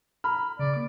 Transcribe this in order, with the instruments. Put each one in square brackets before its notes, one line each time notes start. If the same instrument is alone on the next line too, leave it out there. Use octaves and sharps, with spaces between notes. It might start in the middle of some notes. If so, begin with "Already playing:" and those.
[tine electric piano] A#5 F6 [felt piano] B5
[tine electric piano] C#3 [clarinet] D5
[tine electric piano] A#3 D6